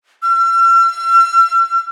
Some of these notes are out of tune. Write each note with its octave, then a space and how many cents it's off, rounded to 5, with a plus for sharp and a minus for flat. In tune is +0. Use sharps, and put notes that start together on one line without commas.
E6 +45